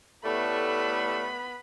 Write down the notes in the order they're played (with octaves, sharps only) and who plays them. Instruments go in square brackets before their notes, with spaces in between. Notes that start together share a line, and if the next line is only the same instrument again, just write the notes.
[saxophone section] A2 G3 A3 [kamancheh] B3 B5